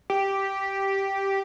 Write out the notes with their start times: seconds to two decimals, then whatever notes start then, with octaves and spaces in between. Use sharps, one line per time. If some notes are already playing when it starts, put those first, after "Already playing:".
0.10 G4